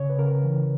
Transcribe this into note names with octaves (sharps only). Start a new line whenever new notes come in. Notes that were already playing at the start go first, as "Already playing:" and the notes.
Already playing: C#3 C#5
B4
C#3 A#4
E3